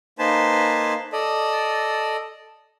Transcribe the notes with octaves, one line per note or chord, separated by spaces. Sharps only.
A#3 D#4 B4 C5 G#5 A5
A4 D5 D#5